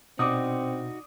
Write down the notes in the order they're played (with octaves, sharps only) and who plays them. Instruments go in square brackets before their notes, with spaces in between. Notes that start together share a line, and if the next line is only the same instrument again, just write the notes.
[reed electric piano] B2 [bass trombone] C4 [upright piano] D4 D6 D#6 [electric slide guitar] D#4 F#4